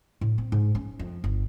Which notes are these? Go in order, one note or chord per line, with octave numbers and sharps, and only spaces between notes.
A2
C4
G#2
C#4
F2
G1